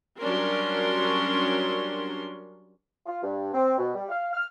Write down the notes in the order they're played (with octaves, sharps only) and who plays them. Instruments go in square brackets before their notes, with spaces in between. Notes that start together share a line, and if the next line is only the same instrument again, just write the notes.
[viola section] F#3 G3 C#4 D4 A#4 C6
[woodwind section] F4
G2
C4
B2
G3
F5
F6